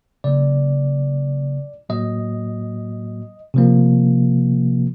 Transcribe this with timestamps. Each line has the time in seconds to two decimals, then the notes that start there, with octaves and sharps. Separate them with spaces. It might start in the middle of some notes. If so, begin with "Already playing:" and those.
0.24 C#3 F#3 A#3 D5
1.89 A2 F#3 A#3 D#5
3.54 C3 F3 A#3